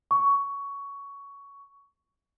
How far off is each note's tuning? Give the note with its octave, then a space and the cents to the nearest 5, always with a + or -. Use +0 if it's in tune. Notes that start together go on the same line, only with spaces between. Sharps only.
C#6 +15